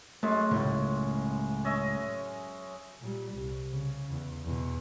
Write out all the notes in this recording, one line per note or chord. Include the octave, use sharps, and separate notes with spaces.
F#2 G#3 A3
C#2 A2 C3
C#4 D#5 E5
A#2 G3
C2
C#3
E2
E2 B2